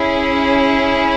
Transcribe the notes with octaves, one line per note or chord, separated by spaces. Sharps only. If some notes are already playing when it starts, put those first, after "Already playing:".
Already playing: C#4 E4 G#4